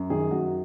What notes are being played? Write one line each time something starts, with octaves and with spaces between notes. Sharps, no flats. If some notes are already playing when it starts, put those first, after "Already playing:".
Already playing: F#2
D#3 G#4
F#2 F#4